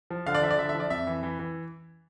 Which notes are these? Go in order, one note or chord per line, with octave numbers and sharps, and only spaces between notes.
F3
D3 F5
D5
F3 E5
D5
D3 E5
E5
F3
D5
F2 E5
E3
E3
E3